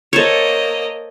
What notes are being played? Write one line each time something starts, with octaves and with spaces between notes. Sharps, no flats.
A#3 A4 C5 C#5 D#5